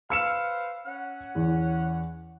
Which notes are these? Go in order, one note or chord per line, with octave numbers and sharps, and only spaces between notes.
B4 C5 F5 E6 C#7 E7
C#4 F#5
E2